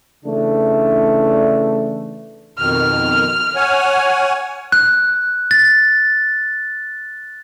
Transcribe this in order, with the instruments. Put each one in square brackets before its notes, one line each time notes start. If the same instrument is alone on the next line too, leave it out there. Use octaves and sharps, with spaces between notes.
[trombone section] C#3 E3 A3 D4
[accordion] F2 B2 D#3 [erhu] F6
[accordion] C#5 F#5 G#5
[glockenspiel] F#6
A6